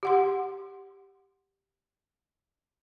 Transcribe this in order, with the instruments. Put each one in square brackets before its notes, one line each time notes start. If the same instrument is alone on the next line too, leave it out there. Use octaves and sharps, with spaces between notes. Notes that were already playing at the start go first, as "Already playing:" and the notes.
[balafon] G4 F#5 C6